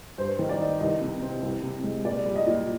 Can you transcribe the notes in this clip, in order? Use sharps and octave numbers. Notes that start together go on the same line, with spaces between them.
G2 C5
D#3
D5
D#4
C2 D#5
C3
C4
C2
C3
G#3
A#2 D5
G3
D#5
A#2